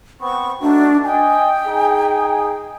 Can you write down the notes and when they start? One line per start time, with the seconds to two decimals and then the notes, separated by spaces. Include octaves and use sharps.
0.21 B3 C4 C#6
0.61 A3 D4 D#4 F#4
1.05 D#5 G5 G#5
1.67 D#4 G#4